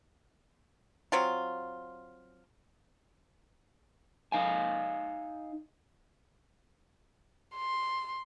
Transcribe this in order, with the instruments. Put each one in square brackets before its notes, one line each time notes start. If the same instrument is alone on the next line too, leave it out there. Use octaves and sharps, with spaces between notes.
[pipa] F#3 C4 F4
[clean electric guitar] D#4 F5 G#5
[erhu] C6